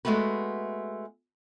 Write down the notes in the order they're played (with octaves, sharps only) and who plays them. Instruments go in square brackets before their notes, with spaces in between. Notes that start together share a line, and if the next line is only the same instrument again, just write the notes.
[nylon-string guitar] G#3 A3 B3 F#4 B4